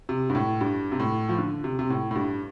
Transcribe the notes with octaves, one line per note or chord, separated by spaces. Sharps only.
C3
G2
A2
G2
C3
A2
F3
D3
C3
C3
A2
A2
G2